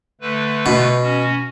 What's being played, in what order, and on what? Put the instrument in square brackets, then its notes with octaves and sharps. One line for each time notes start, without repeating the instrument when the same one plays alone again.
[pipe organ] D3 A3 B4
[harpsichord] B2
[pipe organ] C#4 F#4